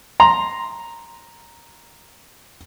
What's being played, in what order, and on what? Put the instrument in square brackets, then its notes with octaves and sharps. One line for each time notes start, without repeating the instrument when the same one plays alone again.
[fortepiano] A#5 C6